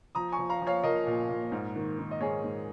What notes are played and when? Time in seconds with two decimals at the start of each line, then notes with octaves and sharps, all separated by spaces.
0.15 F3 A#5 D#6
0.32 G#5 C#6
0.38 F3
0.49 F5 A#5
0.62 F3
0.67 C#5 F5
0.84 F3 A#4 D#5
1.07 A#2
1.29 A#2
1.52 G#2
1.76 D#3
1.99 D#3
2.11 D#5
2.21 G#2 G#4 C#5
2.44 G#2